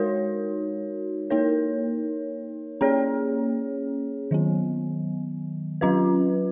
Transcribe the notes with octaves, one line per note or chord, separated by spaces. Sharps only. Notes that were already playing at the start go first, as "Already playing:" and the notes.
Already playing: G#3 D#4 F#4 A#4 C#5
A#3 D#4 A#4 C#5
A#3 C#4 G#4 C#5
D#3 F#3 B3
F#3 C#4 F4 B4